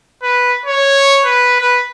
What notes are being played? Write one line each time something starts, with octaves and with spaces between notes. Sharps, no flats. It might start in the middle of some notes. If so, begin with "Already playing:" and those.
B4
C#5
B4
B4